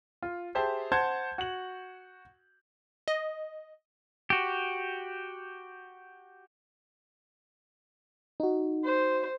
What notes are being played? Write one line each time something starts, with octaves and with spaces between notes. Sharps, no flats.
F4
G4 G#4 C5 E5 A5
C5 F#5 A5 C6 G6 G#6
F#4 F#7
D#5
F#4 G4
D#4 F#4
C5